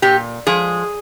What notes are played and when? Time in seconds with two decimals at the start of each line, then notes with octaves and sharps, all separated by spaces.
0.02 A#2 G4
0.47 F3 G#3 G#4